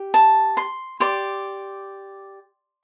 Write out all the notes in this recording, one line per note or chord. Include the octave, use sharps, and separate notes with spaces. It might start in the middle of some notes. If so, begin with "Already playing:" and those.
Already playing: G4
A5
C6
G4 D5 C6